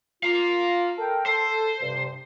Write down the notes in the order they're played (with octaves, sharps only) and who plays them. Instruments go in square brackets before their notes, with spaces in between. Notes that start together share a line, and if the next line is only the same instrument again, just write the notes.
[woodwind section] F4 [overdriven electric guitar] F5 A#5
[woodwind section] A4 A#4 G5
[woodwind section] A4 [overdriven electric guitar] C5
[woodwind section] G2 C3